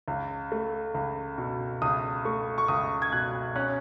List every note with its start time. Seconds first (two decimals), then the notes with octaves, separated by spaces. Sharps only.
0.08 C#2
0.52 A3
0.94 C#2
1.38 B2
1.82 C#2 D#6
2.25 A3 C#6
2.58 C#6
2.68 C#2 D#6
3.02 G#6
3.12 B2 F#6
3.56 C#4 F#6